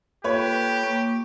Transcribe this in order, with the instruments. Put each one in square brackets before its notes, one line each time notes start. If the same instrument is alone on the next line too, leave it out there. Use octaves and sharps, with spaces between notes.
[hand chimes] A#3 F4 A4 [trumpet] G4 [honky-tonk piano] B4 C#5
[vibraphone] A#3 [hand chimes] C#6